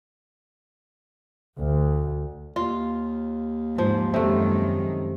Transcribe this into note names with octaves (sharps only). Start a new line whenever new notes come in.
D2
D#2 F4
G#2 F3
F#2 C3 D#3 G#3 A3